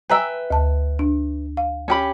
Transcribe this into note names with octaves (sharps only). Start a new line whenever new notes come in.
B4 E5 G5 G#5 A#5 E6
D2 A5
D4
F5
C#4 G4 B5